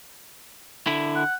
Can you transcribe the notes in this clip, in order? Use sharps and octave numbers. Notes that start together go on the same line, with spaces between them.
D3 E4
F#5